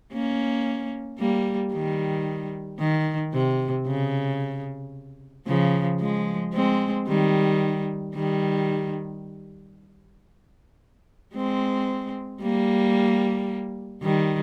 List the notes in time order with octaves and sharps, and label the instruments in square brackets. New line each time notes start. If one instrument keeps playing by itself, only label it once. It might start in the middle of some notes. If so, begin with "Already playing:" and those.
[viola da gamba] A#3 C#4
G3 A#3
D#3 G3
D#3
C3
C#3
C#3 F3
F3 G#3
G#3 C4
D#3 G3
D#3 G3
G#3 C4
G3 A#3
D#3 G3